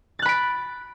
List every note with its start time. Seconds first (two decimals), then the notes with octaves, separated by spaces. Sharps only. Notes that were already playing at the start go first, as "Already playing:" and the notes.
0.19 A6
0.22 F#6
0.25 B5
0.29 D7
0.32 B6